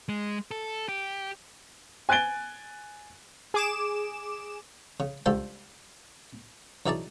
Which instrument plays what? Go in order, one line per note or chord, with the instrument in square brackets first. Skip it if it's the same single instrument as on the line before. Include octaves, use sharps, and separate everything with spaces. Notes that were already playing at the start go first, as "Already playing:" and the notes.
[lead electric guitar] G#3
A4
G4
[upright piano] G#5 F#6 G#6 A6 D7 G7
[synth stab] G#4 D6 E7
[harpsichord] C#3
C#2 G2 F4 A4 C5 A5
F#2 E3 D#4 G#4 D5 A5